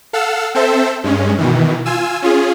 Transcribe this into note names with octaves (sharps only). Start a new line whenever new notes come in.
A4 F5 F#5 E6
C4 A4 C5 E5
G2 G#3 C#4
B2 D#3 E3
F4 G#5 E6
C#4 F4 G#4